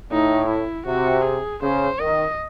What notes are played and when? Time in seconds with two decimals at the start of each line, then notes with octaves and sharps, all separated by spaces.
0.12 A2 D#4
0.49 E4
0.87 C3 F#4
1.25 G#4
1.63 C#3 C5
2.00 D#3 D#5